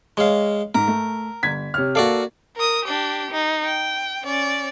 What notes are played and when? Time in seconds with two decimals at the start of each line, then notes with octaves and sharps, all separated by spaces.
0.17 G#3 C#5 F5
0.75 G#2 A#4
0.88 A3
1.43 G1 G#6 B6
1.74 C3 C#5 F6
1.95 A#3 F#4 A4 D5 F5
2.56 A#4 D#6
2.85 D4 G4
3.31 D#4
3.65 G5
4.24 C#4 D5